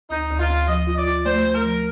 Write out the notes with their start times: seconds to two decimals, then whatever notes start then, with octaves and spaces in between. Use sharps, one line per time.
0.10 D2 D#4
0.30 D2
0.39 F4
0.49 D2
0.68 F3 D#5
0.87 F4
0.97 D5
1.06 F4
1.25 A3 C5
1.45 A3
1.55 A#4
1.65 F3